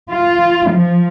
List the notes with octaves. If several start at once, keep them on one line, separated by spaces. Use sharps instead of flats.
F4
F3